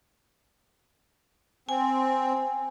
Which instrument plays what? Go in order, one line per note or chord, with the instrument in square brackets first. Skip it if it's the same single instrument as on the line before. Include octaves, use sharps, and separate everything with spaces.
[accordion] C4 [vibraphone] G#5